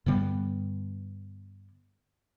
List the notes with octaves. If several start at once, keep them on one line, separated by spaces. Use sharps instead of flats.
G2 D3 G3 B3